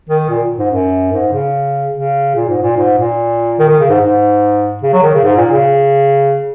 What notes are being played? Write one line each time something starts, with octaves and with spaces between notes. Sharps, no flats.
D#3
A#2
G#2
F#2
G#2
C#3
C#3
A#2
G#2
A#2
G#2
A#2
D#3
D#3
C#3
G#2
G#2
C#3
F#3
D#3
C#3
G#2
A#2
C#3